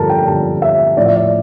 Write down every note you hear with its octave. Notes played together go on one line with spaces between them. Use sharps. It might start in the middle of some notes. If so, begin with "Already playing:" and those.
Already playing: G2 D3 F3 A4 A#4 A5
G5
G2 D3 F3 A5
E5
A2 F3 D5
E5
D5